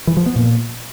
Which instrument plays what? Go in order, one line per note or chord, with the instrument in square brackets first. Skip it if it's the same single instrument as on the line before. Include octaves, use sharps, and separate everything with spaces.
[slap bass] E3
F3
B3
A#2